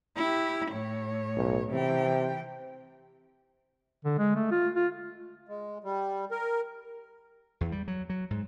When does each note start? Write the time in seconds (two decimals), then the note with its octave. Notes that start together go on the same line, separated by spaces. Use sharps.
0.16 E4 G4
0.71 A2 C#5
1.37 B1
1.70 C3 E3 G5
4.05 D3
4.18 G#3
4.36 A3
4.51 F4
4.75 F4
5.49 G#3
5.84 G3
6.31 A#4
7.61 E2
7.72 G3
7.88 F#3
8.10 F#3
8.31 G#2